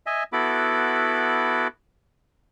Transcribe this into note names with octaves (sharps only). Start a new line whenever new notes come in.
D#5 E5 G#5
B3 E4 F#4 A4 B5 D6